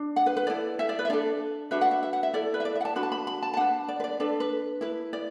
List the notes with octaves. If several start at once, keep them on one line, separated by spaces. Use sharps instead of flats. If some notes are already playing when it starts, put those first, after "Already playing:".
Already playing: D4
F#5
B4
B4
E4 A4 D5
E5
D5
B4
E5
D4 A4 D5
D4 F#4 B4 E5
F#5
E5
E5
F#5
E5
E4 A4 D5
B4
E5
D5
E5
F#5
A5
D4 F#4 B4 B5
A5
B5
B5
A5
A5
D4 B4 F#5
D5
B4
D5
D4 A4 B4
B4
E4 B4
D5